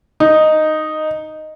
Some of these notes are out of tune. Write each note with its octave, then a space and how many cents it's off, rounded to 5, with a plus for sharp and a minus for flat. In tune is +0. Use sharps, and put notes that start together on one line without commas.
D#4 -5